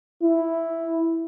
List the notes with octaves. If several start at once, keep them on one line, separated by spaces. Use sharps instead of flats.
E4